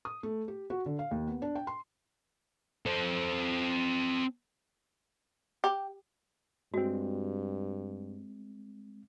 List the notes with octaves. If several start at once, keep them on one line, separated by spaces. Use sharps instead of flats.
D#6
A3
G4
F#4
D3
F5
D#2
B3
D4
G5
C6
C4 A4
G4
G2 G#3 C4 F#4